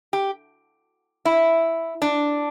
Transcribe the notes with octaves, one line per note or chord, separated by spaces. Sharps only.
G4
E4
D4